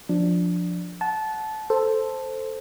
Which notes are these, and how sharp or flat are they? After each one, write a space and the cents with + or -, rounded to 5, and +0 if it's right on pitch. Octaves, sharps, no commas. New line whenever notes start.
F3 +10 D4 +0
F#5 +0 A5 -20
A4 +0 C5 +0